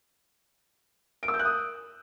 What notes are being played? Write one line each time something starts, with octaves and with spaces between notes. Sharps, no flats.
D7
E6
G6
F#6
D#6